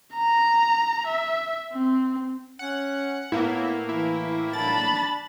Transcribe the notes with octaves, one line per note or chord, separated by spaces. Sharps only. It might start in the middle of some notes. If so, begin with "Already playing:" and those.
A#5
E5
C4
C#4 F#5
A2 A#3 B3 E4
E3 E4
D4 A5 B5 A6